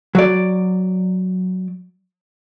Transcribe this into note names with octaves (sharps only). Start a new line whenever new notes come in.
F#3 D5